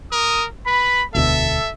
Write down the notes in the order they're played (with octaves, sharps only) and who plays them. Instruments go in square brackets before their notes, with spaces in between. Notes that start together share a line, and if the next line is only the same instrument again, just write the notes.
[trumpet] A#4 [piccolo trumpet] D#6
[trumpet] B4 [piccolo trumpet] B5
[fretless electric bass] E1 D2 B2 [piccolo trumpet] A4 [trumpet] E5